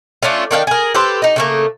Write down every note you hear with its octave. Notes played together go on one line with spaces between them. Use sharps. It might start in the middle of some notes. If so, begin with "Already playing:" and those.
A3 C#4 D4 F4
D#3 D4 F5 G5
G#4 A#4
G4 A4 B4 C5
D#4 D#5
C#3 A3 A#3